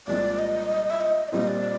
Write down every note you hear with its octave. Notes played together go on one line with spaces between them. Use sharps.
C2 A#2 F3 G#3 C4 D5
D#5
E5
D#5
D5
A#2 G3 C4 F4 D#5
D5